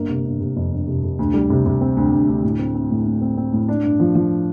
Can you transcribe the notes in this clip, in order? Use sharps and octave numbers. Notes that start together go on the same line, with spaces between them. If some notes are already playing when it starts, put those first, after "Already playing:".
Already playing: G1 A#3
C3
G1
C3
F2
G1
C3
C3
D2
G3
C3
C3
C4
D2
D2
D2
A2
C4
C4
A2
A2
C4
C4
A2
D4
G2
F3
F3